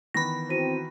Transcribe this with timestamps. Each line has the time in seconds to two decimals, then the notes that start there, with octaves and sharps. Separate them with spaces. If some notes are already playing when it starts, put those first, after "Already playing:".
0.14 D#3 E3 B3 B5 A#6
0.49 C4 E4 F#4 D#7